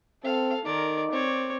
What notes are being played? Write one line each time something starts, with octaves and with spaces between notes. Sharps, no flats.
C4 A4 F5
D#3 D#4 A#4 D5
C4 C#5 D5